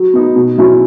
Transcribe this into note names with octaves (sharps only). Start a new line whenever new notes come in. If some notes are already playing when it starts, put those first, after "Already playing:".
Already playing: F#3
B3 D#4
B2
F#3 C#4 E4